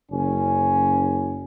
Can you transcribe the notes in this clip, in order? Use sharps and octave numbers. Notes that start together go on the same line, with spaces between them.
F#1 C#4